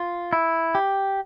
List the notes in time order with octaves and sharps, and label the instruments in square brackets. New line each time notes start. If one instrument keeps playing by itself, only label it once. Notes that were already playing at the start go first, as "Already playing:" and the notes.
Already playing: [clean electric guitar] F4
E4
G4